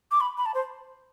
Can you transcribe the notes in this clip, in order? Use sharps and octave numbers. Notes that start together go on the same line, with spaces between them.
D6
B5
B5
A5
C5